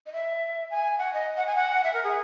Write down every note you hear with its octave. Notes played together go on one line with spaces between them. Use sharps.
D#5
E5
G#5
F#5
D#5
F#5
G#5
F#5
E5
A#4
G#4